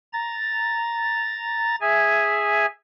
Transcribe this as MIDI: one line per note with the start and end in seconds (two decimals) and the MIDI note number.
0.13 1.76 82
0.13 1.76 93
1.81 2.66 68
1.81 2.66 76
1.81 2.66 80